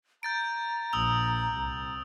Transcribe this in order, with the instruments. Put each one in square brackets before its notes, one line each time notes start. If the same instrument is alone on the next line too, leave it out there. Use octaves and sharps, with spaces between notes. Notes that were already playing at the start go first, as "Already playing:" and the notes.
[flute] A#5 [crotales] G6 A6 D7
[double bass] A#1 [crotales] D#6 E6 F7
[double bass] C2